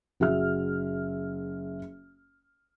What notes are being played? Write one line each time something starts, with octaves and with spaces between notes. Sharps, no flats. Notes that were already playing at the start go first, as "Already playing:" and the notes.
F#1 F#4 G#4 E5 F6